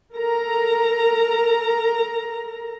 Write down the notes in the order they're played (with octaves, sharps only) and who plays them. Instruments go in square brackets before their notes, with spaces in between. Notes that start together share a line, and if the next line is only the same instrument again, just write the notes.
[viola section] A4 A#4 A#5